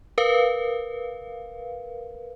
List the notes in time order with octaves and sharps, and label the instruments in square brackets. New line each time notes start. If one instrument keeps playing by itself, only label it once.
[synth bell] A#4 B4 F5